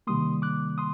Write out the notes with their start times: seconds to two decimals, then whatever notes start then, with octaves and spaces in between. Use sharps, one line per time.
0.07 C3 D#3 G3 A#3 C6 D#6
0.42 D6 F#6
0.78 C6 D#6